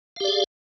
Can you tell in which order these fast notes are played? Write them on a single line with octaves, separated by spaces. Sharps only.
F5 G4 D5 G#4